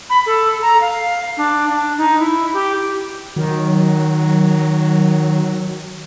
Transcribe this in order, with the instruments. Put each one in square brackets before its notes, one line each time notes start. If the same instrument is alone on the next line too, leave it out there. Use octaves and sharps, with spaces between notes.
[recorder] B5
A4
A#5
F5
D4
D4
D#4
E4
G4
[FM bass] D#3 [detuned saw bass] F#3